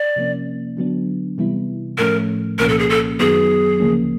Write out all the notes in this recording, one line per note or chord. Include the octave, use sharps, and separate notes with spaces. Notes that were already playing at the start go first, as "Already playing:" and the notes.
Already playing: D5
C3 F3 A#3 C#4
D3 F#3 B3 D4
C3 E3 G3 B3 E4
A2 F3 A3 C#4 A#4
C2 A#2 F3 A#3 C#4 A#4
A4
G#4
A4
F#2 D#3 F#3 B3 G#4
D2 C#3 F3 A#3 C#4